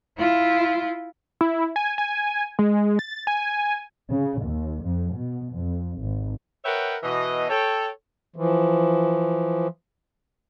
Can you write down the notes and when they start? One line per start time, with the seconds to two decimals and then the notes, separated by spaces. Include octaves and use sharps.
0.18 E4 F4
1.41 E4
1.76 G#5
1.98 G#5
2.59 G#3
2.99 A6
3.27 G#5
4.10 C#3
4.43 D#2
4.84 F2
5.15 B2
5.54 F2
5.99 G#1
6.65 A#4 B4 C#5 E5 F#5 G5
7.03 B2 E3 D#5
7.49 A4 C#5 G5
8.36 E3 F3